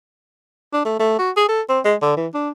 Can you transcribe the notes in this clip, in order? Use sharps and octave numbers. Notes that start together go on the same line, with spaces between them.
D4
A3
A3
F#4
G#4
A4
C4
G#3
D3
E3
D4